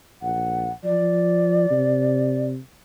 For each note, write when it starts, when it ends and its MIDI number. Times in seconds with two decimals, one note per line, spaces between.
0.22 0.70 34
0.22 0.71 78
0.84 1.66 53
0.84 2.46 74
1.70 2.58 48